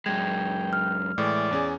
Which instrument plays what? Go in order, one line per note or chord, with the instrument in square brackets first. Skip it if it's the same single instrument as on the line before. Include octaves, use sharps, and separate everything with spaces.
[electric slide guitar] F#2 G#3 [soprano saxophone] G5 [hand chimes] G#6
[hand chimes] F6
[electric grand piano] A2 E3 G#3 [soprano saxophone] D5
[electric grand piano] E2 C#4 G#4